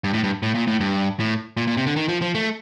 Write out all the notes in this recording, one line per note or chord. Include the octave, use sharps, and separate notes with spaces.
G2
A2
G2
A2
A#2
A2
G2
A2
A#2
A#2
C3
D3
D#3
F3
F3
A3